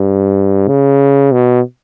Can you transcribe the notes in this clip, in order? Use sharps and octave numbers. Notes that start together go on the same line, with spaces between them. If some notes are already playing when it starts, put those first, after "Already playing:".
Already playing: G2
C#3
B2